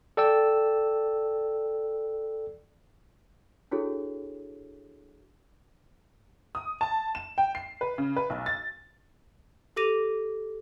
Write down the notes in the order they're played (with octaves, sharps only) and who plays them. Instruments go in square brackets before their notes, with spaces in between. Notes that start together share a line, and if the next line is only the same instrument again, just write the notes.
[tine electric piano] A4 D5 G5 E6
[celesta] D4 E4 F#4 G#4 A4 C#5
[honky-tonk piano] D#6
A5
E7
G5
C7
B4
C#3
B4
B1
A6
[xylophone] G4 A4 D6 A#6 D#7 F7